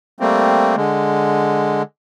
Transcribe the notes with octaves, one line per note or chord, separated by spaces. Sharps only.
G3 A3 A#3 C4
D3 G#3